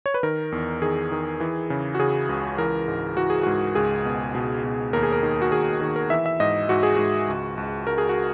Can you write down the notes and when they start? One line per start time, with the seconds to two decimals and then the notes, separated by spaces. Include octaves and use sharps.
0.06 C#5
0.14 B4
0.23 D#3 A#4
0.52 E2
0.82 D#3 G#4
1.12 D#3
1.40 E3
1.70 C#3
1.95 F#4
1.99 C#3 G#4
2.29 C#2
2.58 E3 A#4
2.88 G#2
3.17 E3 F#4
3.30 G#4
3.43 G#2 F#4
3.75 C#2 G#4
4.05 B2
4.35 B2
4.64 B2
4.93 D#2 A#4
5.03 G#4
5.12 A#4
5.23 D#3
5.42 F#4
5.52 D#2 G#4
5.81 D#3 G#4
5.96 A#4
6.10 E3 E5
6.26 E5
6.40 G#2 D#5
6.69 G#2 F#4
6.83 G#4
6.96 G#2 F#4
7.28 C#2
7.58 C#2
7.87 C#2 A#4
7.98 G#4
8.09 F#4